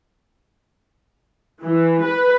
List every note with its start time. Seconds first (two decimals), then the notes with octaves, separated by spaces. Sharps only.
1.63 E3
2.05 B4